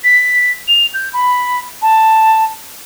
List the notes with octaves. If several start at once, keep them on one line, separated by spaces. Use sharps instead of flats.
B6
F7
G6
B5
A5